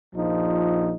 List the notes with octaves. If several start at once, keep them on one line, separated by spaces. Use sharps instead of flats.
A#1 F3 D#4